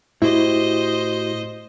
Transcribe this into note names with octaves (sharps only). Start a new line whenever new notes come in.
A2 E4 F#4 G4 C5 D#5